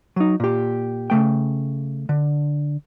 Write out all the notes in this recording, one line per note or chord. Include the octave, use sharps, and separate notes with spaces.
F#3 D#4
A#2 G4
C#3 A3 G5
D3